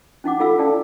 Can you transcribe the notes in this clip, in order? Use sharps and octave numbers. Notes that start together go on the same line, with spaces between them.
C#4 D#4 F#5 D6
F4 A4 F5 B5 E6
C#4 E4 A4 D5 A5